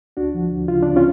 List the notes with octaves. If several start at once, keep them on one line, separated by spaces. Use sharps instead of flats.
D2 D4 F#4
F3
D2
C#3 F4
D2 D4
C#4 F4